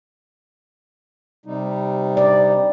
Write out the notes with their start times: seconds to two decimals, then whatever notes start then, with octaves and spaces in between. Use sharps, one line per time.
1.46 C3 G3 D#4
2.17 D5